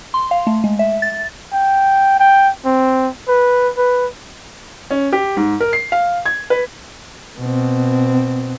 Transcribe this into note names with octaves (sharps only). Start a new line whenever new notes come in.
C6
F5
A3
G#3
E5
A6
G5
G5
C4
B4
B4
C#4
G4
G#2
A#4
C7
F5
G#6
B4
B2 C4